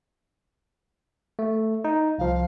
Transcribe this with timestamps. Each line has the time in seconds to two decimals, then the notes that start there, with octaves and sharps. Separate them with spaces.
1.39 A3
1.85 D#4
2.18 C2 F3 F5